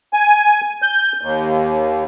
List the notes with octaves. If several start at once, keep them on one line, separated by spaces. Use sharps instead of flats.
G#5
G6
D#2